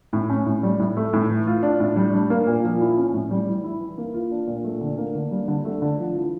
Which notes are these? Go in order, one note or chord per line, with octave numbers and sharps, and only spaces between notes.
A2
C#4
A2
G3
A2
A3
A2
E3
F4
D4
A2
G3
D4
A#3
A#2
F3
E4
C#4
A2
G3
E3
E4
E3
A#3
F4
D4
A#2
A3
D3
A#3
D3
G3
D3
A3
D3
F3
E3